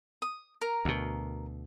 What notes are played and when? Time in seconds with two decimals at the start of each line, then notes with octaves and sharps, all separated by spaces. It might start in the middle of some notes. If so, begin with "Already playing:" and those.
0.22 D#6
0.61 A#4 A#5
0.85 D2 B2